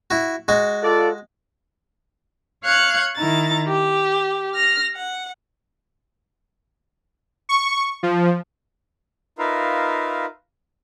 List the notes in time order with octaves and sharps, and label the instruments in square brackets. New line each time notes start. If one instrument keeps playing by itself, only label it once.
[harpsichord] E4 F#4
G#3 F#4
[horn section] F4 A4 D5
[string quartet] C#5 F5 F#6 G#6
D#3 E4 A#5 A6
G4
F6 A#6
F#5
[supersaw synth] C#6
F3
[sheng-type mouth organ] D#4 F4 A#4 B4 E5 F5